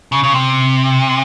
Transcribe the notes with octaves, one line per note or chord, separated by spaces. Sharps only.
C#3
C#3
C3